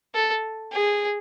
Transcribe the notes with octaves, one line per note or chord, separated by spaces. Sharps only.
A4
G#4